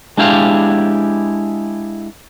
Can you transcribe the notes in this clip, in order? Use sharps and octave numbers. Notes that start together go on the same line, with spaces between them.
G#3 D4 E4 G4 F5